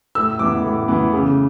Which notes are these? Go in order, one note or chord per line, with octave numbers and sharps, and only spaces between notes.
A2 E6
E3 B3 D6
A2
E3 B3
C#3